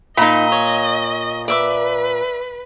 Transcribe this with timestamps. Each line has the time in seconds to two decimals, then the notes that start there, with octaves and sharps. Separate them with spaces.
0.17 A#2 D#4 D#5 B5
0.52 C#5
1.48 B4 D5 E5 D6